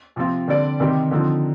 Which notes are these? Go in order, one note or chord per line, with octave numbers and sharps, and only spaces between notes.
C3 F3 C4 F4
D3 G3 C4 G4 D5
C3 D#3 G3 C4 G4
D3 F3 C4 D#4